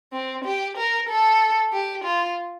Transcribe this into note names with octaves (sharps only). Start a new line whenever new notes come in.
C4
G4
A#4
A4
G4
F4